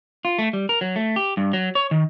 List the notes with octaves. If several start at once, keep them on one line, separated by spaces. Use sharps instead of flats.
F4
A3
G3
A#4
F#3
A3
G4
G2
F#3
C#5
D#3